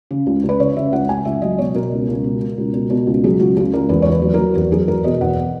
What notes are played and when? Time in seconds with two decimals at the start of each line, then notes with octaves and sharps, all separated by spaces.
0.11 C#3
0.26 C#2
0.44 C#2
0.49 B4
0.60 C#3 C#5
0.76 C#3 E5
0.92 C#2 F#5
1.09 C#2 G#5
1.25 C#2 E5
1.42 F#3 D#5
1.58 B2 C#5
1.74 B2 A#4
1.92 C#2
2.08 C#2
2.24 B2
2.41 B2
2.58 C#2
2.74 B2
2.90 B2
3.07 C#2
3.24 F#3 G#4
3.39 C#2 F#4
3.56 C#2 G#4
3.74 C#2 A#4
3.89 E2 B4
4.02 C#5
4.06 E2
4.12 B4
4.22 F#3
4.34 F#3 A#4
4.55 E2 F#4
4.72 F#3 G#4
4.88 E2 A#4
5.04 B2 D#5
5.21 E2 F#5